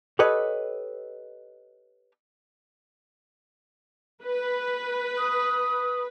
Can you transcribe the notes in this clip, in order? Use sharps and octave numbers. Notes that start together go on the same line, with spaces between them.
G4 A4 B4 C#5 D#5
B4
D#6